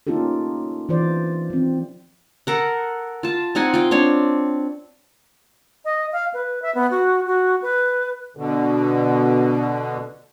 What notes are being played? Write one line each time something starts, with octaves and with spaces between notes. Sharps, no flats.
A#3 C#4 D#4 F4 G4 A4
E3 F4 C5 D5
F3 C4
A4 A#4 F#5
F4 A5
C4 D#4 F#5 G#5
F4 G5
C4 D4 C#5
D#5
F5
B4
E5
B3
F#4
F#4
B4
B2 D3